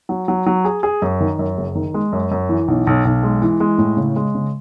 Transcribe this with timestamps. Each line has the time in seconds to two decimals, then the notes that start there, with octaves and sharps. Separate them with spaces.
0.09 F#3
0.28 F#3
0.46 F#3
0.65 G#4
0.83 G#4
1.02 F#2
1.20 D#3
1.39 F#2
1.57 F#1
1.75 D#3
1.94 G#3
2.12 F#2
2.31 F#2
2.49 E3
2.68 B1
2.87 B1
3.05 B1
3.23 G#3
3.42 E3
3.60 G#3
3.78 A2
3.97 C#3
4.16 G#3
4.35 C#3